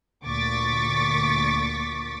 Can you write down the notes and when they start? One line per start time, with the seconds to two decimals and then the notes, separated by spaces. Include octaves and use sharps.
0.24 D2 A#2 C#6 D6 A6 B6